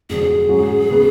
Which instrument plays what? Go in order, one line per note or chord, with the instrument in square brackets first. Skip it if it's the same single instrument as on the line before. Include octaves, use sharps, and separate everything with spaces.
[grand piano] F1 F2 D3 F#3 [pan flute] G#4
[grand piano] G#2 F#3 C#4 F#4
C#3 F#3 B3